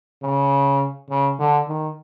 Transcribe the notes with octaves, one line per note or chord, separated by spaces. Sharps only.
C#3
C#3
D3
D#3